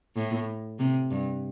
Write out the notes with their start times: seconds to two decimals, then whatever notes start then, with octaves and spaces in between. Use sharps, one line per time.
0.16 A2
0.79 C3
1.10 G2